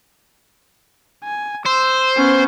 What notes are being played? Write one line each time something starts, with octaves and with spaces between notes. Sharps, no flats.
G#5
C5 E6
B3 C#4